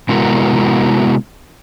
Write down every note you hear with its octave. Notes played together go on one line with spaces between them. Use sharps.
C3 G#3 B3 E4 F#4 A#4